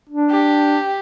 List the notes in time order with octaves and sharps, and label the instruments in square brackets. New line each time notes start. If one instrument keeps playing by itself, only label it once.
[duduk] D4
[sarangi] G4